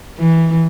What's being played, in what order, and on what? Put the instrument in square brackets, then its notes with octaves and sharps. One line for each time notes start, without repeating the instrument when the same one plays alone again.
[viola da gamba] E3